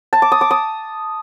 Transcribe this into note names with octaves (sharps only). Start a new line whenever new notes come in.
A5
D6
D#6
D6
D#6